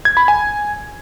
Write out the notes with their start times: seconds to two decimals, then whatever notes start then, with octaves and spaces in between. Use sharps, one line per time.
0.05 G#6
0.17 B5
0.28 G#5